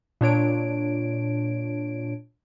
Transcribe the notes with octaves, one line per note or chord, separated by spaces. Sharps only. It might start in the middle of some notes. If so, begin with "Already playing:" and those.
A#2 D4 C#5 D7